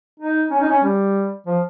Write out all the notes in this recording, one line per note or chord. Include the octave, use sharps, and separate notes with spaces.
D#4
C#4
D#4
C#4
G3
F3